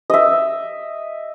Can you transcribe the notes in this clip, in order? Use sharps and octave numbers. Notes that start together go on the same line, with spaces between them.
D#5 E5